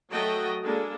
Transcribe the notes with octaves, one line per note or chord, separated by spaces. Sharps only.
F#3 A3 F#4 D#5 G5 A5
G#3 A#3 D4 A4